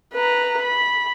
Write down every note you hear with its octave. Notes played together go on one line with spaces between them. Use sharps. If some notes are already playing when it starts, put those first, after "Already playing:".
B4 A#5
B5